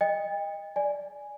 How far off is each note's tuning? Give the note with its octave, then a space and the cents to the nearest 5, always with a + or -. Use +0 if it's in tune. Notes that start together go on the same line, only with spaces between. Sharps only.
D#5 +0 G5 +40
D5 +0 G#5 +0